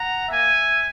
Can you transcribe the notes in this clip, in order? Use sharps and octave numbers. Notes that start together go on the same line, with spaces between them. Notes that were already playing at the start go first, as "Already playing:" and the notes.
Already playing: F#5 A#5
A#3 E5 G#5